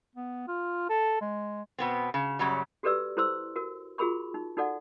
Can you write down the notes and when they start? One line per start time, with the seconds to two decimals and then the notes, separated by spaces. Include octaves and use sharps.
0.15 B3
0.48 F4
0.89 A4
1.21 G#3
1.78 B2 B3 C4
2.14 C#3
2.39 F#2 C#3 F#3 G3
2.83 F#4 G4 A4 B4 D5 E6
3.17 E4 A4 C5 C6 E6
3.56 F#4 A#4
3.98 F4 F#4 G#4 A#4 B5 C#6
4.34 D#4
4.57 D#4 F#4 A4 D5 F#5